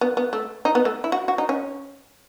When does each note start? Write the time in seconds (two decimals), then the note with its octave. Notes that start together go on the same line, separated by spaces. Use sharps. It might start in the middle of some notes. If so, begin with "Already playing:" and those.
0.01 B3
0.17 B3
0.33 A3
0.65 D#4
0.75 B3
0.85 A3
1.04 E4
1.12 F#4
1.28 F#4
1.38 D#4
1.49 C#4